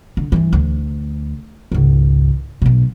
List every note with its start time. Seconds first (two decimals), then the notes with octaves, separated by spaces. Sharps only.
0.17 D3
0.32 G2 E3
0.53 D2
1.72 G#1 C#2
2.62 B1 B2